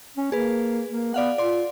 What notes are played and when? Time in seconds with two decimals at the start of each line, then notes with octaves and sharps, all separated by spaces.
0.17 C#4
0.32 A#3 G#4 B4
0.88 A#3
1.14 B3 D5 F5 F#5
1.38 F4 D5 C6